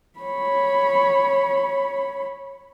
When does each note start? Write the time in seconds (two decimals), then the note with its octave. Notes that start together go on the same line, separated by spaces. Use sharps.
0.19 C#5 B5